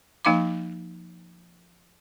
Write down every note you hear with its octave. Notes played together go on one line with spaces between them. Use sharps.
F3 A#3 D#4 F5 B5 D6